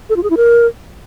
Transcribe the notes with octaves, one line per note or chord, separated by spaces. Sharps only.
A4
F4
G#4
E4
A#4